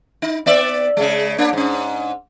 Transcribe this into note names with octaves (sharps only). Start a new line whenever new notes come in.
D#4
B3 D5 E5
C#3 G#3
A#3 D4
G#2 C#4